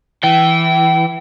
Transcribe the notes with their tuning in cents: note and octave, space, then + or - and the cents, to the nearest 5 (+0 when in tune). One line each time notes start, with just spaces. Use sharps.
E3 +0 G5 -30